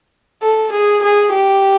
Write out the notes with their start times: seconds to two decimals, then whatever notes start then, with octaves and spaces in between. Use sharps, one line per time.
0.42 A4
0.72 G#4
1.03 G#4
1.33 G4